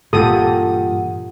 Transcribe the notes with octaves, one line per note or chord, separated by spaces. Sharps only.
G2 A#2 E3 F4 G4 A4 F#5 D#6